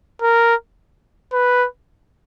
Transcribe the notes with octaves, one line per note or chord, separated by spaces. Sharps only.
A#4
B4